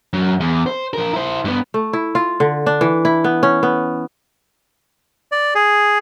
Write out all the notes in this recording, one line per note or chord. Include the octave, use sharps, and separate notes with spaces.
F#2
E2
C5
F3 A#4
E4 C5
G2 B3
A3
E4
F4
D3
D4
E3
E4
B3
C#4
B3
D5
G#4